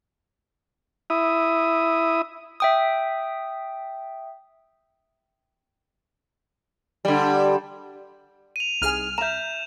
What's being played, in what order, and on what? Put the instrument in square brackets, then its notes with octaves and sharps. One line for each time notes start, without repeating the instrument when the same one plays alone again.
[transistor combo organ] E4 D#6
[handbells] E5 G5 D#6
[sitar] D3 G3
[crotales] D#7 F7
[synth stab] C2 F6 [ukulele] D#4 G#4 G#5
[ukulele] E5 A#5 [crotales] G6 E7